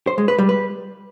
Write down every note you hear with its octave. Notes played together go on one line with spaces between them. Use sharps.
C5
G#3
B4
G3
B4